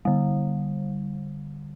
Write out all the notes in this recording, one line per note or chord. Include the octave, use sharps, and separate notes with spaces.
D3 G3